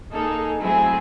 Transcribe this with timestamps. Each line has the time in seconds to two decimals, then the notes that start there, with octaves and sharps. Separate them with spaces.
0.11 A#3 D#4 G#4 A4
0.61 F#3 A3 C4 E4 G#4